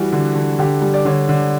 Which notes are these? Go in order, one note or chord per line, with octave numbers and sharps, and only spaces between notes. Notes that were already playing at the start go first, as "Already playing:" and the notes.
Already playing: E3 G3 F#4
D3
D3
D3 G4
G3
D5
D3 C#5
D3